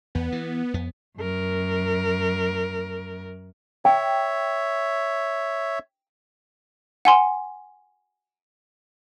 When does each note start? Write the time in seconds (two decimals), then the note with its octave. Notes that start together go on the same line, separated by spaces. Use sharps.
0.15 E2 B3
0.32 E3
0.74 F2 B3
1.18 F#2 A#4
3.85 C#5 E5 G5
7.05 F#5 G#5 C6